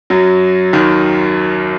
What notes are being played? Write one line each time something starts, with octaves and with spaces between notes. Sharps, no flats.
F#2 F#3
D#2 D#3